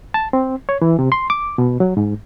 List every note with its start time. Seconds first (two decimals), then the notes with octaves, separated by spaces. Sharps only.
0.14 A5
0.33 C4
0.69 C#5
0.82 E3
0.99 C3
1.12 C6
1.30 D6
1.58 B2
1.80 F#3
1.97 G#2